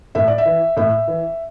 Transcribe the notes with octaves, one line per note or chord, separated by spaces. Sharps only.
A2 E5
D5
E5
E3
A2 E5
E3